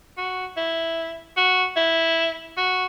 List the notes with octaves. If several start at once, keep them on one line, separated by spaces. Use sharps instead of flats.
F#4
E4
F#4
E4
F#4